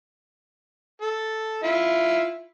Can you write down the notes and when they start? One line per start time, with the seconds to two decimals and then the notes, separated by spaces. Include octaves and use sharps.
1.02 A4
1.63 E4 F4 E5